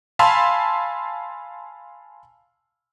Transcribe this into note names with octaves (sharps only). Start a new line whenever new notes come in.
F5 G#5 A5 B5 C6 E6